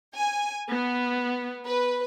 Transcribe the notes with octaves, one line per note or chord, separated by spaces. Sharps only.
G#5
B3
B4